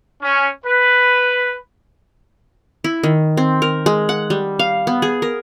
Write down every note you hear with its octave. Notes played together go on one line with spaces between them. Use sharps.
C#4
B4
E4
D#3
C4
A#4
G#3
F#5
G3
F5
B3
G#4
A#4